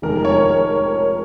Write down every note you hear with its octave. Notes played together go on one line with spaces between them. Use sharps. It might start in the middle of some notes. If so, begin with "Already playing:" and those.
F1 F2 D#3 G#3 A#4
C#5
C#5